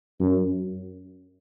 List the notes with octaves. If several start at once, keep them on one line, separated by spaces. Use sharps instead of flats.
F#2